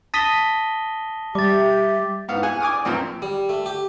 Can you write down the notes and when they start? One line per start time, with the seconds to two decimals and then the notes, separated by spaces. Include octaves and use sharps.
0.14 A5 D#6 A#6 B6 G7
1.35 G3 G4 E5 D6 A6
2.28 G#2 B3 F5
2.43 G#4 F#5 G#5
2.60 G#5 D6 D#6 F6
2.73 D5
2.85 F#2 A#2 F3 B3 C4
3.22 G3
3.49 A3
3.66 G4